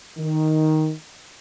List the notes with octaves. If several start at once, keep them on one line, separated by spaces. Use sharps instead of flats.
D#3